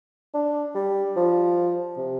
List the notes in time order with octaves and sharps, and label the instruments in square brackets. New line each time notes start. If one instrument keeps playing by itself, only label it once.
[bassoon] D4
G3
F3
C3